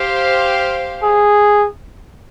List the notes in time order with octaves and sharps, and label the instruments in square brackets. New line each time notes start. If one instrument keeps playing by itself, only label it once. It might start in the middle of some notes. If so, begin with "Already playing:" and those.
Already playing: [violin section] G4 C5 F5
[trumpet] G#4